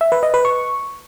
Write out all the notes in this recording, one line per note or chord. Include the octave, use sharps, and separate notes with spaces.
E5
B4
D#5
B4
C#6